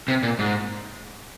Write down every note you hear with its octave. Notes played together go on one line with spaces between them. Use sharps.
C3
A#2
G#2